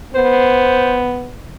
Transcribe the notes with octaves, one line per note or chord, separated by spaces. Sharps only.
B3 C5